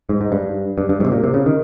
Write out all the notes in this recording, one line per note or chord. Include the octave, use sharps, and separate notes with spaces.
G#2
G#2
G2
G2
G2
G#2
C3
A#2
C3
C#3
D#3